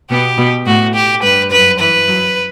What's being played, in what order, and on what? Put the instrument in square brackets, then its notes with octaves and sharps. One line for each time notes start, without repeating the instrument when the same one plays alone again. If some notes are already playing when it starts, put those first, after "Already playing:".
[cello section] B2 B3 [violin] G4
[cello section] B2 B3
[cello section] A2 A3 [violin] F#4
[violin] G4
[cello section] G2 G3 [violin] B4
[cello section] F#2 F#3 [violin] B4
[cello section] E3 [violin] B4
[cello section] F#2 F#3